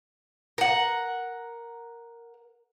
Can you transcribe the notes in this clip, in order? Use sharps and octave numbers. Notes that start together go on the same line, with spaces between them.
A#4 F#5